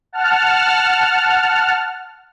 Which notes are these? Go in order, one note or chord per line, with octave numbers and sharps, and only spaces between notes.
F#5 A5 F6